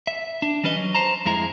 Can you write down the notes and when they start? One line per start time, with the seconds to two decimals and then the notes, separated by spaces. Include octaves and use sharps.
0.07 E5
0.42 D4
0.63 E3 G3 C#4 B4 D#5
0.76 F#3
0.95 C5 A5 A#5
1.26 F2 G#3 E4 A#5